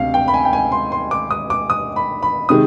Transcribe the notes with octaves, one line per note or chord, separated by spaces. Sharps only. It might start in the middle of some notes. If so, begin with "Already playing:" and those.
Already playing: D2 C3 F5
G5
B5
G#5
G5
G#5
C6
C6
D6
D#6
D6
D#6
B5
B5
C3 D#3 G#3 D#6